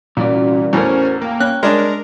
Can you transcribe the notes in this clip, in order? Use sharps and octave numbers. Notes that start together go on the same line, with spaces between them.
C2 A#2 E3 C#4 F#4 D5
E2 A2 C#4 F#4 A#4 C5
A#3 G5
C#4 F#6
G#3 D4 A#4